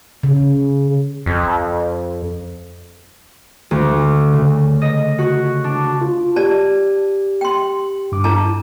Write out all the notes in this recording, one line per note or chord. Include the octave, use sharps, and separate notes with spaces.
C#3
F2
D2
C#3
D#5
F#4
D4
F4
G4 D5 A5
G5 C6
G2 D6
D4 E4 A5